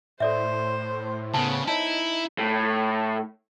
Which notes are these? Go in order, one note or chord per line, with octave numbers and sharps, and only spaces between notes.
A2 A4 C5 D5 E5
C#3 B3 A5
D#4 E4 C#5 A5
A2